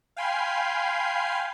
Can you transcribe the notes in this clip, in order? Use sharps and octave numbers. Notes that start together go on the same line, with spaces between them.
F5 G5 G#5 B5 C6 C7